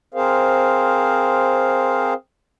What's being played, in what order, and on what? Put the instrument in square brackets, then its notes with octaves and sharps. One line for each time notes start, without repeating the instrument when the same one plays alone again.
[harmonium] C4 G#4 A#4 C5 F5